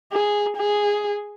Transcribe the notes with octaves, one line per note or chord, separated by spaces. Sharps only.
G#4
G#4